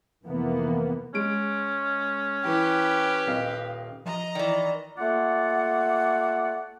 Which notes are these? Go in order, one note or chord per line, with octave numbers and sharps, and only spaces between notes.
F2 C3 E3 A#3 B3
G#3 C#4 D7
E3 G4 B4
D#1 D#5 F5
F3 D#5 A#5
D#3 E3 D5
A3 A#3 F4 D5 F#5